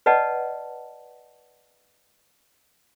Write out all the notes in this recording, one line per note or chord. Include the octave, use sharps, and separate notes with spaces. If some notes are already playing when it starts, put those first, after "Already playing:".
B4 D5 D#5 F#5 A5